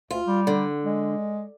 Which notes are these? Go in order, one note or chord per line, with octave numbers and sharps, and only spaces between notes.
D2 F4
G3
D3
G#3